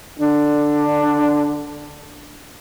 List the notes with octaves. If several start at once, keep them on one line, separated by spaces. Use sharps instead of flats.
D3 D4